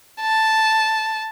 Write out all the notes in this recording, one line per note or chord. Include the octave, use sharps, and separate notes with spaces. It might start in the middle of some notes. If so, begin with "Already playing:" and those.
A5